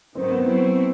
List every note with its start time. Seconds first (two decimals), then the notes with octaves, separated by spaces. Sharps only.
0.15 G#2 D#3 F#3 C4
0.31 B3
0.46 F#3 A3 C4 E4